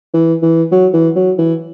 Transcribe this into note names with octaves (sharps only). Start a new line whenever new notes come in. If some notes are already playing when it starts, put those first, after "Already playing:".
E3
E3
F#3
E3
F#3
E3